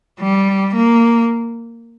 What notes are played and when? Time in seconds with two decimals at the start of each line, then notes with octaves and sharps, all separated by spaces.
0.20 G3
0.74 A#3